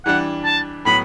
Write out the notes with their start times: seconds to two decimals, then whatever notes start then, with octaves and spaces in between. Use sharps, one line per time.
0.06 E3 G3 D4 F#5
0.45 A5
0.85 A2 F#3 B3 B5